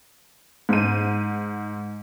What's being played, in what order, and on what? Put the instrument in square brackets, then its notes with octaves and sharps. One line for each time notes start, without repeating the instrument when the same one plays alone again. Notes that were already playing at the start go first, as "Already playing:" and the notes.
[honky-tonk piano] G#2 D#7